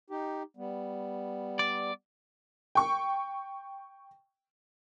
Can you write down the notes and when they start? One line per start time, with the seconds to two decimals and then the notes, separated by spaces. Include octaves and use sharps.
0.10 D#4 G4
0.57 G3 B3
1.59 D5
2.75 G5 C#6